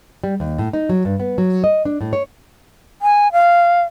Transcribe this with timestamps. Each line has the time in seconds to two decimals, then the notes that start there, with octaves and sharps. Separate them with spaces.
0.24 G3
0.40 D#2
0.58 A2
0.73 D#4
0.89 F#3
1.05 G2
1.20 B3
1.38 F#3
1.64 D#5
1.85 D4
2.01 A2
2.13 C#5
3.02 G#5
3.32 F5